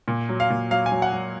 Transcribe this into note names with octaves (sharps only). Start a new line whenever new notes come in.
A#2
F#3
F5
A#2
F#3 F5
G#5
F#3
F#5
F#3